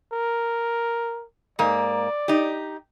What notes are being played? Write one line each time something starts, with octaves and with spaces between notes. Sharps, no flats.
A#4
G#2 A#3 D5
D#4 G4